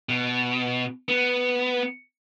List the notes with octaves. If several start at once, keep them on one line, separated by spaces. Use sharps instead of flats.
B2
B3